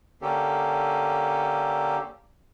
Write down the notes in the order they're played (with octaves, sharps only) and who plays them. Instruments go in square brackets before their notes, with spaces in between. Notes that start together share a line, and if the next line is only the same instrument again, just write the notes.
[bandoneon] D3 A#3 C#4 G4 A4